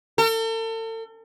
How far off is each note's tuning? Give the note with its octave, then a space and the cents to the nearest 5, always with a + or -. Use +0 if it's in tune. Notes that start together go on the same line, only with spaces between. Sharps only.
A4 +40